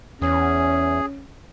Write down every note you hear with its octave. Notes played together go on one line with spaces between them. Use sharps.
E2 C#4 G#4